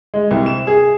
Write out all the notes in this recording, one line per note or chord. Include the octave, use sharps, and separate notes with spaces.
G#3
C2
E7
G#4